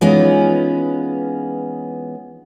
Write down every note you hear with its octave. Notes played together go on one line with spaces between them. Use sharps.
E3 G#3 B3 C#4 D#4 F4